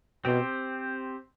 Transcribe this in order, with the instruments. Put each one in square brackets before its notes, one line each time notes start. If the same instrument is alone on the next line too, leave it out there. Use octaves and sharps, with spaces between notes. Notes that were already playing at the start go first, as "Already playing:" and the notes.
[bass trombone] B2 [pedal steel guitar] C4 G4 C5